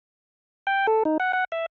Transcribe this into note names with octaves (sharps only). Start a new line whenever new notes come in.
G5
A4
D#4
F#5
F#5
E5